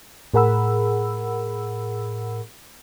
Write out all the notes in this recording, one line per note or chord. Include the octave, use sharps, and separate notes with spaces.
A2 G#4 A#4 F#5 B5 E6